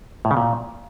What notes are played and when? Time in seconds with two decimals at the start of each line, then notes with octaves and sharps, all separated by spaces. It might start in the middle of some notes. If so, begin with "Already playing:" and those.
0.25 A2
0.31 C#3
0.37 A#2